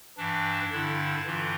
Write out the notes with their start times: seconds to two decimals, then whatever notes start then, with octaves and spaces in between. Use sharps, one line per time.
0.18 G2 E3 D4
0.72 G2 D3 E4
1.26 G2 E3 F4